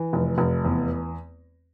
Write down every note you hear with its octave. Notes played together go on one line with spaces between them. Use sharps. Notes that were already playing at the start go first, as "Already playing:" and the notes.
Already playing: E3
F1
F1
E2